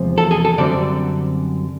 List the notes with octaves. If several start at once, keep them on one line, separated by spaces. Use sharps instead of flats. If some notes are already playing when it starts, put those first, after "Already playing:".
Already playing: E2 C3 F3 G#3 C4
A4
G#4
A4
F#2 D3 G3 C4 D5